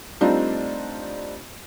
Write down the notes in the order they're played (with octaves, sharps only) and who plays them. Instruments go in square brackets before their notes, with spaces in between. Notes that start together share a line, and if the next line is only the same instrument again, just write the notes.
[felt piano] G3 A3 C4 D4 D#4 F4